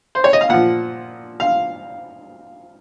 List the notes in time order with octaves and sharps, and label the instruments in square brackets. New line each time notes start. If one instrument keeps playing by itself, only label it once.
[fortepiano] C5
C#5
D#5
F5
A#2 F3 F#5
F5